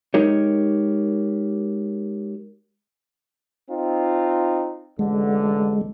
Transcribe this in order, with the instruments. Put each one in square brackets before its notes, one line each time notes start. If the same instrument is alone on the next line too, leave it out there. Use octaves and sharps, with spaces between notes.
[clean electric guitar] G#3 D#4 G4 A#4 C#5
[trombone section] C4 D#4 F4
[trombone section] A1 D3 [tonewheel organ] G#3